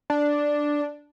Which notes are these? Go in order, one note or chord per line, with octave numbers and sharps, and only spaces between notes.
D4